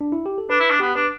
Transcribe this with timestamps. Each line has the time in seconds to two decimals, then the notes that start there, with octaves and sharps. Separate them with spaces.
0.01 D4
0.12 E4
0.26 G4
0.38 A4
0.50 D4 B4
0.60 E4
0.70 D4
0.80 B3 G4
0.95 D4 B4